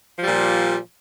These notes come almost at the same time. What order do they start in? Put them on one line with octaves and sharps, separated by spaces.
F3 G3 A#2